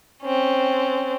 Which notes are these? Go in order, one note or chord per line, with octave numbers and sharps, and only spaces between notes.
C4 C#4